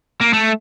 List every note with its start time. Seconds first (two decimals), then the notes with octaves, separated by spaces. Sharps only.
0.21 A#3
0.33 A3